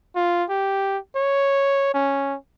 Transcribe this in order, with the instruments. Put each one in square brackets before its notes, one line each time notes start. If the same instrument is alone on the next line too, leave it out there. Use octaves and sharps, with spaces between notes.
[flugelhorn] F4
G4
C#5
C#4